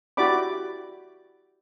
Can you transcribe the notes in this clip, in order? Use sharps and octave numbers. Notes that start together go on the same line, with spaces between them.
E4 F#4 G4 D5 B5 D6